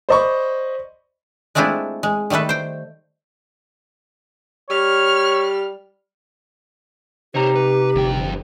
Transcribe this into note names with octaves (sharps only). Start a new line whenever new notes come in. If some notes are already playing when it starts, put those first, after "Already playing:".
C5 D5 D#5 B5 C#6
G#3 A3 C4 D4 E4 F4
G#3
D#3 G3 A3 A4 B4
C5 G5
G3 C#5 F6
C3 D#4 G4 C5 C#5 A#5
B4
G1 F2 G5